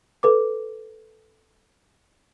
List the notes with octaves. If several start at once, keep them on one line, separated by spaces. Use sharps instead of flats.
A4 B4 D6